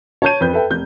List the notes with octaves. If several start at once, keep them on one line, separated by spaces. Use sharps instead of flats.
C#5 A5 G6 D#7
F2 B4 G6
A4 B4 E5 G5
F1 G6